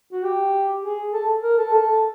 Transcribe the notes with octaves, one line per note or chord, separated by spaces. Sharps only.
F#4
G4
G#4
A4
A#4
A4
A4